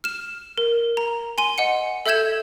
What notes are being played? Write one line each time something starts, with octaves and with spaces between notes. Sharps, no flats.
F6 E7
A#4
A#5
G#5 C6 D#7
D#5 F#5 C#7
A4 E5 E6 G6 G#6 E7